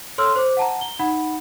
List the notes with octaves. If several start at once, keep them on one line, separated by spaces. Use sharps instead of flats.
A4 C#5 C6 E6 F6
C5 D6
F#5 A5 A#5
G7
D#4 F#5 B5